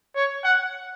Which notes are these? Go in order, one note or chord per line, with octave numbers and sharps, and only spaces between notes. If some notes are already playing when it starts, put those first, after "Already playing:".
C#5
F#5